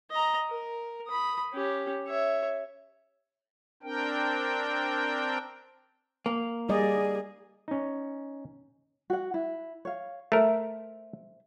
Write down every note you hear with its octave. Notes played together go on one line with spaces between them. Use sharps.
D#5 A#5
A#4
B5 D#6
C#4 G4
C#5 E5
C4 D4 A#4 G5
A#3
G3 G#4 D5 D#5
C#4 D#4
F#4 F#5
E4
C#5 F5
A3 A#4 C5 E5